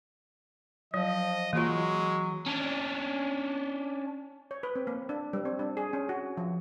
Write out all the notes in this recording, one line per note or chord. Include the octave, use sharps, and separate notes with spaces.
F3 F#3 D#5
E3 F#3 G#3 A#3 F4
C#4 D4
C#5
B4
C4
A#3
D4
G3
C4
D4
G#4
C#4
F#4
F3